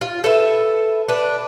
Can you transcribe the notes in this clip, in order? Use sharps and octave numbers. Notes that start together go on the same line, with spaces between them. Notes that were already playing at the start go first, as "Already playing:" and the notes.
F4
A4 B4 E5
D4 B4